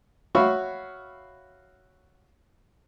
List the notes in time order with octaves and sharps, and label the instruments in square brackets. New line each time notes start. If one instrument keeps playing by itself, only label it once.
[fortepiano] F#4 C#5 E5 F5 B5 C#6